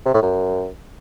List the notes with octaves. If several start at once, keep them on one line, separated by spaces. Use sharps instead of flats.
C3
A2
F#2